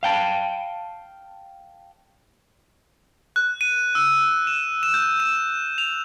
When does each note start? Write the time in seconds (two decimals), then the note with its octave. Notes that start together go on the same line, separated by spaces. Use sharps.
0.03 F5 G5 A5
3.36 F#6
3.61 D#7
3.95 E6
4.47 E7
4.83 E7
4.94 G6
5.20 E7
5.78 F7